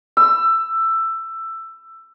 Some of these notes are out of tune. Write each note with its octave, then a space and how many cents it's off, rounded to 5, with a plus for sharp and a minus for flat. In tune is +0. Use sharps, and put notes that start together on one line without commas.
E6 +15